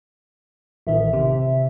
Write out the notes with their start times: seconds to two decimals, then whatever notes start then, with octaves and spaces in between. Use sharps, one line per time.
0.87 A1 D#3 E5
1.13 C3